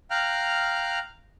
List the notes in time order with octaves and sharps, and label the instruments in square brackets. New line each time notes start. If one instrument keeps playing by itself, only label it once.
[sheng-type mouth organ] F5 G5 A#5 F6 F#6